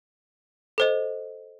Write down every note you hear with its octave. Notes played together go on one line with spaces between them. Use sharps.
A4 C5 D#5